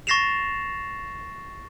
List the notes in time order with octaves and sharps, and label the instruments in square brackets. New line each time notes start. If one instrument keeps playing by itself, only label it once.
[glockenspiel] C#6 A6 A#6 C7 E7 F7